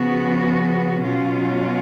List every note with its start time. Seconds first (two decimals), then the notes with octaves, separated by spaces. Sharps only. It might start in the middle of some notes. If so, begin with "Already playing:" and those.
Already playing: C#3 F3 B3 F#4
1.03 B2 F#3 C#4 F4